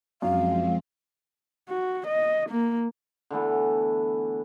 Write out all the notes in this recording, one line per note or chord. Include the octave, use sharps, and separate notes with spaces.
F#2 F3 G#3 C4 F5
F#4
D#5
A#3
D3 E3 A3 B3